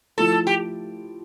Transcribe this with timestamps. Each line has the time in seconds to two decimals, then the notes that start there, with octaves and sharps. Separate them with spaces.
0.18 F3 A3 E4 A4
0.47 G4